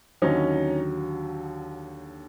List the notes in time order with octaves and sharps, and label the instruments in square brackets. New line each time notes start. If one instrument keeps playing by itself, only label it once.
[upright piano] D#2 D3 F#3 C#4 D#4